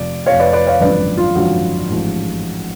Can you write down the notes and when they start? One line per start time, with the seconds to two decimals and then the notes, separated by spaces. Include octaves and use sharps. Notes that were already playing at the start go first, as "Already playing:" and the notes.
Already playing: F1 F2 F3 D5
0.26 F1 F2 F3 C#5 F5
0.40 B4 D5
0.53 B4 D5
0.67 C#5 F5
0.81 G#1 F#2 D3 F3 B4 D5
1.17 F4
1.35 G#1 F#2 D3 F3 F#4
1.89 A1 G#2 F3